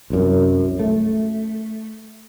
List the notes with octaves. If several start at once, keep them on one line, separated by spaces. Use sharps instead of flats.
C2 F#2
A3